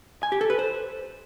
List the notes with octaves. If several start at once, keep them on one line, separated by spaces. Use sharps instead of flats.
G#5
G4
A4
B4
C5